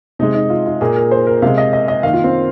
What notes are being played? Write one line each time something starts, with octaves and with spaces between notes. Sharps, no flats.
C3 G#3 D#4
D#4
F4
F4
A#2 A#3 G#4
A#4
C5
A#4
C3 G#3 F5
D#5
D#5
D#5
D#3 A#3 F5
F4
C4